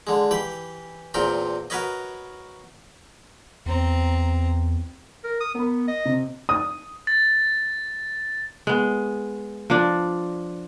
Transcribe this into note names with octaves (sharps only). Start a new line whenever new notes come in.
D3 G#3
E3 G4 B5
E2 A#2 C4 A#4 G5
F#4 A#4 B4 C#5 D#5
E2 C4 A#5
A#4
D#6
B3 A#4 B5
D#5
C3
D#6
A6
G#3 B3
F3 D4